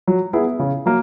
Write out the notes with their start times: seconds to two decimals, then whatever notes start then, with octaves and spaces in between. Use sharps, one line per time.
0.08 F#3
0.33 B3 E4 G#4
0.59 C#3
0.86 F#3 A#3